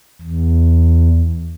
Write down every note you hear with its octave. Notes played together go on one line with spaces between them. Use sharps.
E2